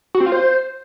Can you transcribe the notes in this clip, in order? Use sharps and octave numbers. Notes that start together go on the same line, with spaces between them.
F#4
C4
F4
C5